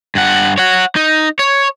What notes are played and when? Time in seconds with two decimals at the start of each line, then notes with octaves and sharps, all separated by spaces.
0.15 G2 F#5
0.58 C#5 F#5
0.96 D#4
1.39 C#5